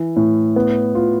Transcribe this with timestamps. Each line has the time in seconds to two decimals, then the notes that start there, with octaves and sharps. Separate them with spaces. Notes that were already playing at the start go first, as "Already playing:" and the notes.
Already playing: E3
0.16 A2
0.56 B3
0.95 F4